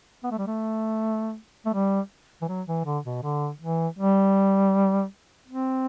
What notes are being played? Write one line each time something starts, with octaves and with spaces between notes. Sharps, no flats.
B3
A3
G3
A3
A3
G3
E3
F#3
E3
D3
B2
D3
E3
G3
C4